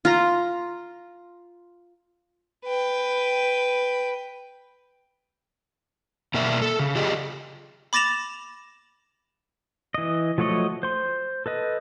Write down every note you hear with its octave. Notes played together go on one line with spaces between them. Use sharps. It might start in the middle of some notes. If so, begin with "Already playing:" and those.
F4 A#5
B4 G5
B2 A#3 A#4 D5 E5
A4
C#3
F4 G4 G#4 D5 D#5
B5 D6 A6 A#6 E7 F7
E3 D#5
F3 F#3 A3 C#5 D#5
C5 C6
A4 B4 D#5